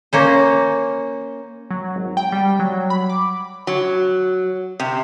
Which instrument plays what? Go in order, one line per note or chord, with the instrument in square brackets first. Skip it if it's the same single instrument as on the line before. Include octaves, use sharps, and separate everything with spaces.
[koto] A#3 C#4 C5
[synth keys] F#3
G#1
G5
G3
F#3
B5
D6
[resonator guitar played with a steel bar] F#3
C3